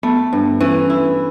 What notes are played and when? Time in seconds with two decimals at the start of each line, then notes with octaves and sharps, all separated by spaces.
0.03 A3 B3
0.33 G2
0.61 E3 C#4
0.90 E4